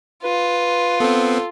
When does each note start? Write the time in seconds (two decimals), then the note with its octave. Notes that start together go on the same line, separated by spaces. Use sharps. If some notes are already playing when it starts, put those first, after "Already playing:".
0.24 F4 B4
1.00 B3 C4 A4